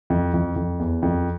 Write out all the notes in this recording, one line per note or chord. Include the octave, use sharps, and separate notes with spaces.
F2
F2
F2
E2
F2